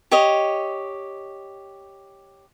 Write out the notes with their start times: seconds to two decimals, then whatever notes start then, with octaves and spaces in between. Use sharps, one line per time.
0.11 G4 C#5 D#5